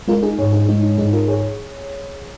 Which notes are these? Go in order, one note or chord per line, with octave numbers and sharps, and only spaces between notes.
G#3 F4 A#4
D#4 G#4
G#2 G#4 C#5
D#4 G#4
G#3 D#4
D#4
G#2 D#4 G#4
F4 A#4
G#4 C#5